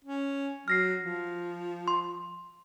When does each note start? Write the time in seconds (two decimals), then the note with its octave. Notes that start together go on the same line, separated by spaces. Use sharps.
0.05 C#4
0.68 F#3 F6 A#6 C7
1.03 F3
1.88 C6